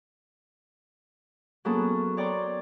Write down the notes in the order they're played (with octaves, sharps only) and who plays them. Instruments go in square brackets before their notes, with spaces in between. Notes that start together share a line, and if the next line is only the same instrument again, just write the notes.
[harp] F#3 A#3 B3 C#4 G#4 A4
C#5 D5 G5 A#5 C6